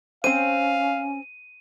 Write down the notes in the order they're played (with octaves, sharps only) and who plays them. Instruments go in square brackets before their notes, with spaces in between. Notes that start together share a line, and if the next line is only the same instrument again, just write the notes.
[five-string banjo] C4 C5 [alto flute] C#4 [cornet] F5 [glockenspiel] D#7